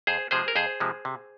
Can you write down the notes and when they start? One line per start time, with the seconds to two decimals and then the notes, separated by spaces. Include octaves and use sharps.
0.07 F2 G#4 C5
0.31 C3 F3 G#3 G#4 C5
0.48 A#4
0.55 F2 G#4 C5
0.80 C3 F3 G#3
1.05 C3